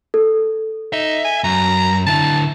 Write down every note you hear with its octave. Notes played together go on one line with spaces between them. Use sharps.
A4
D#4 E5
G#5
F#2 A#5
D3 E4 A5